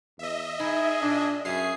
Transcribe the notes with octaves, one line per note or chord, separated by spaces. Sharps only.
E2 D#5 E5
D#4 E4 G#4
A#2 D4
F#2 F#4 G#4 E5 F5 C7